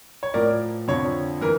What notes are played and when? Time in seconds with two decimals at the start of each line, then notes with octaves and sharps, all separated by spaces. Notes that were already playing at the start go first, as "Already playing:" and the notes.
0.23 C#5
0.34 A2 F3 A#4 D5
0.88 F2 D3 F3 C#5
1.41 E3 A#4